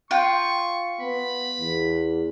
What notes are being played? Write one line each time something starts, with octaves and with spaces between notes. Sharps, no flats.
F4 G5 C#6
B3 B5
E2